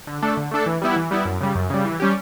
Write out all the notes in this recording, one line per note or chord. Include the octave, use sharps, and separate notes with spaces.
D3
A3 D4 A4
D3
A3 D4 A4
E3
G3 B3 E4
E3
G3 B3 E4
F#2
C#3 G3
F#2
C#3 G3
E3
G3 C#4 G4